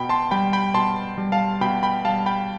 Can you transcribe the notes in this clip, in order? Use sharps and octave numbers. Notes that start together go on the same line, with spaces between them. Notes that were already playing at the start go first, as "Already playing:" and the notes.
Already playing: B2 G5 B5
A5 C6
G3 G5 B5
G5 B5
B2 A5 C6
G3
F5 A5
B2 G5 B5
G5 B5
G3 F5 A5
G5 B5